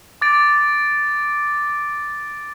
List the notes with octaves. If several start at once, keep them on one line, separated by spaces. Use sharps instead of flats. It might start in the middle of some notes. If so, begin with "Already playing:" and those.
D6 A6 D7